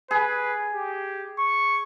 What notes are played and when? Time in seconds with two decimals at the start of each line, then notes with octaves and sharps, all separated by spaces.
0.11 G#4 B4
0.74 G4
1.39 C#6